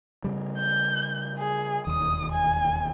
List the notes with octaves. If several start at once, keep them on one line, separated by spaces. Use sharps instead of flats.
C#3 G3
G6
G#4
E1 D#2 D#6
G#5